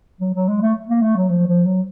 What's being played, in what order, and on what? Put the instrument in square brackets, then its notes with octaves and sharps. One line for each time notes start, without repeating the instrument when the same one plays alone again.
[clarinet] F#3
F#3
G#3
A3
A#3
A3
F#3
F3
F3
F#3